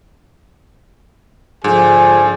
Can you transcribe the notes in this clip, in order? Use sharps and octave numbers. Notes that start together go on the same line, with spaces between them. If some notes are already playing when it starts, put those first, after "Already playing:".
G#2 D3 F3 G#4 G#5